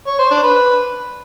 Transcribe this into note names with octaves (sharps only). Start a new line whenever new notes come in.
C#5
C5
D4
B4